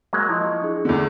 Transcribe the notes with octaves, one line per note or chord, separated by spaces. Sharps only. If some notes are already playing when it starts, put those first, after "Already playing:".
F#3 G#3 A#3
F3 E4 D#5
C#6
D4 G#4
E2 D3